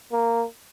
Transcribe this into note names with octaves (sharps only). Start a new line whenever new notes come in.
A#3